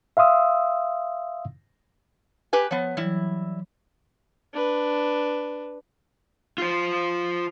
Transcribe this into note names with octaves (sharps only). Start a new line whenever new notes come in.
E5 F5 C6 D#6 E6
G4 B4 G#5
F3 B3 C#5
E3 F#3 G3 E4
D4 B4
F4 C5